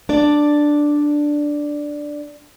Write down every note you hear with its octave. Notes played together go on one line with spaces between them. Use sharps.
D4 D5